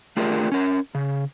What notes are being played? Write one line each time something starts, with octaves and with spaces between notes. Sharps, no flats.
A3 D4 F4 G4 G#4 A#4
C#4 A#4
C#3